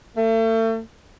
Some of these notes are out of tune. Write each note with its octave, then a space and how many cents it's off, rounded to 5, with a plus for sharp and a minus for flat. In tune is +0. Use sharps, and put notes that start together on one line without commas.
A3 +35